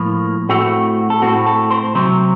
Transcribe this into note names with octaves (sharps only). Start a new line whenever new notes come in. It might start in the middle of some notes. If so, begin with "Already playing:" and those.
Already playing: A2 F3 A#3
A2 A3 C4 F#4
A4
A2 A3 C4 F#4
A4
C5
C3 F#3 C4